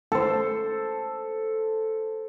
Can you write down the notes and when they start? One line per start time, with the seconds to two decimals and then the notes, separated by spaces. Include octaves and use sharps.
0.12 A4 C5